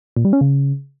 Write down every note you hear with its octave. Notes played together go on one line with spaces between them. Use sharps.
A#2
G3
C#4
C#3